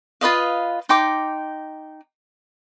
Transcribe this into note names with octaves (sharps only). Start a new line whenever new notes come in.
F4 B4 D#5 F5
D#4 G5 C6 D6